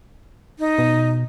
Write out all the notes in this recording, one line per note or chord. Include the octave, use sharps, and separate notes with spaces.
D#4
B2